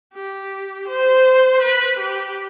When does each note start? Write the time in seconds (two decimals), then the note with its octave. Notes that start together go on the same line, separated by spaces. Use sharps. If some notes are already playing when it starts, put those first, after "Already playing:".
0.14 G4
0.88 C5
1.62 B4
1.99 G4